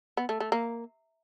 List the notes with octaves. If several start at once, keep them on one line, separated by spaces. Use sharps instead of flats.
B3
A3
A3
A#3